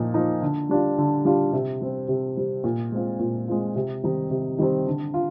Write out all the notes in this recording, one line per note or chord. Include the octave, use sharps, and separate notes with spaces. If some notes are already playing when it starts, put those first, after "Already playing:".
Already playing: A#2 F3 A#3 D#4
F3 A#3 D#4
D3
G3 D4 F4
D3
G3 D4 F4
C3
G3 C4
C3
G3 C4
A#2
G#3 C4 F4
A#2
G#3 C4 F4
C3
D#3 G3 C4 D#4
C3
D#3 G3 C4 D#4
D3
F4